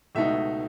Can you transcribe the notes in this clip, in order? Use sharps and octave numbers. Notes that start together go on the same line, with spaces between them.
C#2 B2 A3 D#4 E5